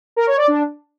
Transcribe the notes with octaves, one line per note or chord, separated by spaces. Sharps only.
A#4
C#5
D5
D4